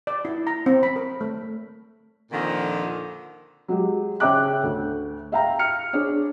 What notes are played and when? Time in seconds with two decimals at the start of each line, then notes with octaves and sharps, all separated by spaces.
0.07 D5
0.25 E4
0.47 A#5
0.66 C4
0.83 B5
0.96 A#4
1.21 A3
2.32 F2 A#2 D3 D#3 F3
3.68 F#3 G#3 G4
4.20 C#3 C#5 E5 G5 D6 F#6
4.63 D2
5.32 E5 F5 G5 A#5
5.59 F6 C#7
5.93 D4 G#4 C#5